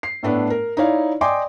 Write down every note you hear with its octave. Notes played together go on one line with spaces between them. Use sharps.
C7
A2 A3 B3 D4
A#4
D#4 E4 C#5 D5 F5
D5 D#5 G5 G#5 C6 D6